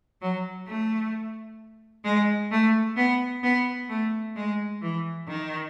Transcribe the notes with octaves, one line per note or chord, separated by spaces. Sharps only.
F#3
A3
G#3
A3
B3
B3
A3
G#3
E3
D#3